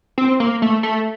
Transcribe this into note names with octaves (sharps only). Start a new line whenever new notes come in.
C4
A#3
A3
A3